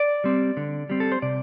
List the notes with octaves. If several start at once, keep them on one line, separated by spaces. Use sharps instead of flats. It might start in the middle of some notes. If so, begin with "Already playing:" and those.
Already playing: D5
G3 C4
D3
G3 C4
A4
C5
C3 D5